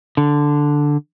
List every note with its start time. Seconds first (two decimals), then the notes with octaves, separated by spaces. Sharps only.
0.17 D3